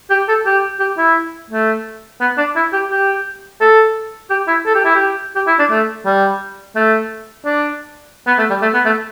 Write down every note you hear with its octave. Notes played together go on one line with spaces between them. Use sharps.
G4
A4
G4
G4
E4
A3
B3
D4
E4
G4
G4
A4
G4
E4
A4
G4
E4
G4
G4
E4
D4
A3
G3
A3
D4
B3
A3
G3
A3
B3
A3